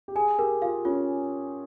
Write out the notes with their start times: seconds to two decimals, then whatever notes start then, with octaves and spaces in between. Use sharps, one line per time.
0.08 G4
0.15 G#4 G#5
0.39 G4 A#4
0.62 F4 F5
0.85 C#4 F4